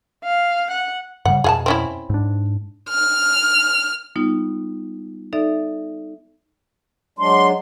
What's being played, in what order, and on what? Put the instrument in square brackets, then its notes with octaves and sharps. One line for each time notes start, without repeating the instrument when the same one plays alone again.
[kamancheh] F5
F#5
[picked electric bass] G2 C#3 G3 [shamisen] F#5
[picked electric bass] F2 B2 [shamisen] G#4 F#5 A5
[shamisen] C4 C#4 E4
[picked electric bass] G#2 D4
[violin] F6
[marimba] G3 B3 D#4 F4
D#4 A4 D5 E5
[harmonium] F#3 G#3 D4 [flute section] C6